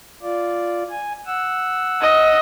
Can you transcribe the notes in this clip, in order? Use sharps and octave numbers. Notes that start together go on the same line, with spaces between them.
F4 D5
G#5
F#5 E6
D#5